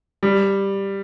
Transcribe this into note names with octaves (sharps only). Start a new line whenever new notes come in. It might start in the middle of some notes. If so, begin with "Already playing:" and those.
G3